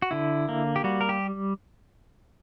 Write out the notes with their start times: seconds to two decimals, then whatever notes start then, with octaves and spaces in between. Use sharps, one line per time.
0.02 F#4
0.11 D3 E4
0.49 A#3
0.76 G4
0.84 G3 F#4
1.01 A#4
1.09 G4